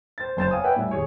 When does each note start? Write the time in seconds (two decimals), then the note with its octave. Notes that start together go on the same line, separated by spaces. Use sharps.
0.18 C5 A6
0.37 F#1 C5 A6 E7
0.51 C#5 F5 G#5 D#6
0.64 B4 D5 E5 F#5 G5
0.76 A2 G3 E5 G#5
0.91 D#1 G#4 C#5